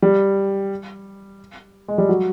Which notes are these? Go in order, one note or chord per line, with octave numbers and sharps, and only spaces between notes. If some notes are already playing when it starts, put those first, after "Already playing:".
G3
G#3
G3
F#3